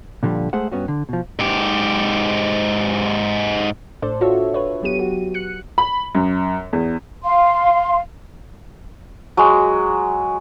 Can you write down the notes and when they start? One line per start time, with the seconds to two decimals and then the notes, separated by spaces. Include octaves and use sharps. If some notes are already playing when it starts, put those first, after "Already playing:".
0.23 A#2 D3 F3 G3
0.53 G#3 A3 G#4 C5 F#5
0.72 G2 B3 C#4 F#4
0.88 D3
1.09 B2 F3
1.39 G#2 G4
4.02 G#1 A2 D4 A4 C5 D5
4.21 F4 F#4 A4 C#5 E5
4.54 F4 B4 C#5
4.81 G1 F#3 B3 G4 D#7
4.99 F#4
5.34 F#6 C#7
5.78 B5
6.15 F#2
6.73 E2
7.24 F5 C6
9.37 F#3 G#3